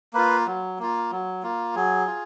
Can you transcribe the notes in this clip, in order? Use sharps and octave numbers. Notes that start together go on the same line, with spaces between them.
A#3 F4 B4
F#3
A#3 F4
F#3
A#3 F4
F#3 G#4
F4